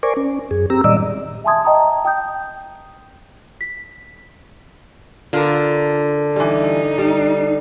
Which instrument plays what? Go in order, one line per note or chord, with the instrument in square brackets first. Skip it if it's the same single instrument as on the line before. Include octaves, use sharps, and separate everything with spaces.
[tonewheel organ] A#4 C5 D5 G#5 C#6 D6
C#4
F#2 G#4
C4 G4 A#5 E6
A#2 D#3 G3 D5 D#5 E6
[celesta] E5 G#5 A5 C6 D#6 G#6
D#5 G5 A5 A#5 D#6
G5 D#6 G6
B6
[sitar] D3 [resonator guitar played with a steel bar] F4 A#4
[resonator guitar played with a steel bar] E3 G3 [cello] D#4
[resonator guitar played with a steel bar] G3